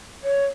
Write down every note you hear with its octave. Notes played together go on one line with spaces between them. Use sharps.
C#5